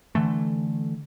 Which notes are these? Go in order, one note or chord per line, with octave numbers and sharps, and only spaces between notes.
D3 E3 A3